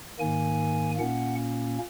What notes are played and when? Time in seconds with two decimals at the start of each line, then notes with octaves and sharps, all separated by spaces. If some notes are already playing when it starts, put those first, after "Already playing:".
0.19 G#2 D#3 A#3 G#5
0.99 A#2 A#3 C#4 F#5